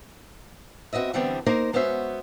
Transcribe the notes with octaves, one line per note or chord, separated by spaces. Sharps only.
C4 F#4 B4 D#5 E5
D3 E3 G3 B3 C4 D4
A#3 D#4 A#4 C5 A#5
G#3 B3 C#4 F#4 C5 E5